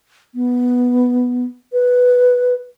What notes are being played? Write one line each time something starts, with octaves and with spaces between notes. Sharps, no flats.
B3
B4